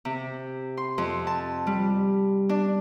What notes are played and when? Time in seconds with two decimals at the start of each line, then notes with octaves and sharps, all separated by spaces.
0.05 C3
0.77 C6
0.98 F2
1.27 A5
1.67 G3
2.49 D4